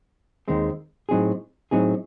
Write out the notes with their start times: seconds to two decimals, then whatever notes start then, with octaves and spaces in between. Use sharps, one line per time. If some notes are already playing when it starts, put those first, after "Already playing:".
0.48 D#2 D#3 G#3 C4
1.09 A2 F#3 C4 D#4 G#4
1.71 A2 F#3 C4 D#4 G#4